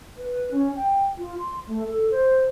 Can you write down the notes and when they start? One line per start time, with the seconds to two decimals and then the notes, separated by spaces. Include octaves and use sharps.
0.18 B4
0.51 C#4
0.76 G5
1.17 F4
1.38 C6
1.67 A3
1.86 A4
2.11 C5